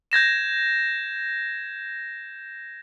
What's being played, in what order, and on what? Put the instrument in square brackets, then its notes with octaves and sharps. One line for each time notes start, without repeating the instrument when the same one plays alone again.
[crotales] G6 G#6 A#6 E7